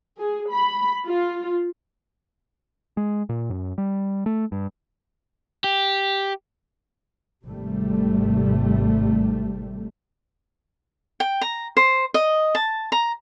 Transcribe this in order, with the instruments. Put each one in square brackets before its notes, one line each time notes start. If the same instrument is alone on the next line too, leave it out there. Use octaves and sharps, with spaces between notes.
[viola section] G#4
B5
F4
[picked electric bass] G#3
A#2
F#2
G3
A3
G2
[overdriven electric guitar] G4
[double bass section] G#1 C3 G3 A3
[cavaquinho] G5
A#5
C5
D#5
A5
A#5